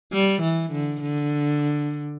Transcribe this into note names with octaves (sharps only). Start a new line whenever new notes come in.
G3
E3
D3
D3